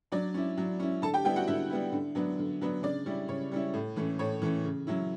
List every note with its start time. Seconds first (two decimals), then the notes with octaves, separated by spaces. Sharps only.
0.12 F#3 D4 D5
0.34 C#4 E4
0.57 F#3
0.80 C#4 E4
1.02 D3 A4 A5
1.14 G4 G5
1.25 G3 B3 E4 G4 G5
1.36 F#4 F#5
1.47 D3 E4 E5
1.70 G3 B3 E4
1.92 D3
2.15 F#3 B3 D4
2.39 D3
2.61 F#3 B3 D4
2.83 C#3 D4 D5
3.06 G3 C#4 E4
3.28 C#3 C#5
3.51 G3 C#4 E4
3.74 A2
3.96 E3 A3 C#4
4.19 A2 C#5
4.42 E3 A3 C#4
4.64 C#3
4.87 F#3 C#4 E4